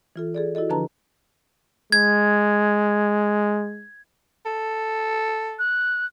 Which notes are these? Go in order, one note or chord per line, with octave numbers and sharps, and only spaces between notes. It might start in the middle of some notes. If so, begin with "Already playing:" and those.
E3 F4 A4
G#4 A4 D5
E4 F#4 A4 D#5
D3 F3 D4 B4 A5 A#5
G#3 G#6
A4
F#6